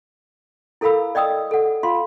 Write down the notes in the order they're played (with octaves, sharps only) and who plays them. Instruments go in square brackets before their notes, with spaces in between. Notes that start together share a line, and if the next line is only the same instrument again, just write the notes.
[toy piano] E4 A4 A#4 F5 B5 E6
D5 D#5 G5 D#6 E6
A4 F#5
F4 F5 C6